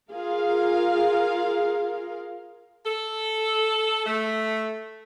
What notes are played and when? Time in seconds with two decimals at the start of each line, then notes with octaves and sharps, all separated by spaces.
0.12 F4 G#4 A#4 F5
2.85 A4
4.06 A3